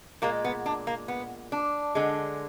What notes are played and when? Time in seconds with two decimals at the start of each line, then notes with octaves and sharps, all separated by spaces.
0.22 A#2 G#3 A#3
0.45 B3
0.66 D4
0.87 A#3
1.08 B3
1.52 D4
1.95 D3 G#3